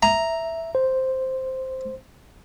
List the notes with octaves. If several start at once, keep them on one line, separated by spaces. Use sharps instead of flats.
E5 A#5
C5